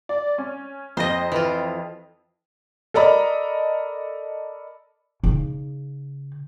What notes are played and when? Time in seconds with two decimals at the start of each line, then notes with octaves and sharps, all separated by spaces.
0.09 D5
0.38 C#4
0.97 F2 C5 D#5 A#6
1.32 E3 F4
2.94 A4 A#4 D5 D#5 A#5 B5
5.24 C#3 D#4